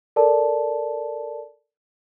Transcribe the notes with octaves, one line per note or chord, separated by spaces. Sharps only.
A4 A#4 D5 A5